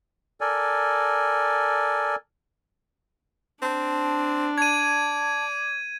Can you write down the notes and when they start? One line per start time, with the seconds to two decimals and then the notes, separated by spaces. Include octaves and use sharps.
0.41 A4 A#4 D5 G#5
3.62 C4 D4 A5
4.58 D5 A5 G#6 D#7